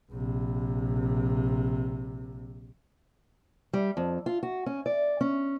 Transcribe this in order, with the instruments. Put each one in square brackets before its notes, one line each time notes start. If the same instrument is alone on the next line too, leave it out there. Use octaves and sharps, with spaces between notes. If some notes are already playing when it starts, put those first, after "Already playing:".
[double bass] A#1 C3
[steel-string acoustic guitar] G3
F2
F4
F#4
C#4
D5
C#4